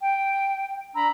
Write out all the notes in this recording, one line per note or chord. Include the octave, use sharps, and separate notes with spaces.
G5
D4 A#5 B5 E6